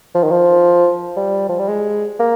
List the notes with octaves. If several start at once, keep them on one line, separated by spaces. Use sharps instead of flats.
F3
D#3
F3
G3
F3
G3
G#3
A#3